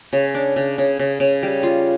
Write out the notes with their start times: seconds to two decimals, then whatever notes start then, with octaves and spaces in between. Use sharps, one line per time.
0.13 C#3
0.34 D4
0.56 C#3
0.78 C#3
0.99 C#3
1.20 C#3
1.43 G3
1.63 F4